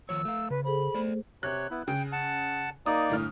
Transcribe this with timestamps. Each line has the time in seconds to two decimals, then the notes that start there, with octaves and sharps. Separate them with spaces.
0.09 D#3 F3 C#5 E6
0.25 A3 F5
0.50 C#3 B4
0.64 G#4 A4 C5 B5
0.94 A3 G#4 C5 D5
1.43 C3 C#5 F#6
1.71 B3 E4
1.88 C#3 G5
2.12 F#5 A5
2.86 A#3 D#4 D5 D#6
3.09 G1 A2 F6